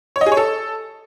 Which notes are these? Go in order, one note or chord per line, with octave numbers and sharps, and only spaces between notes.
C#5
D#5
G#4
C#5
A4